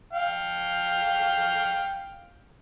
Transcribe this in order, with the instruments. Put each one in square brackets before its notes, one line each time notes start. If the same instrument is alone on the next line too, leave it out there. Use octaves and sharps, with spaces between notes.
[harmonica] F5 G5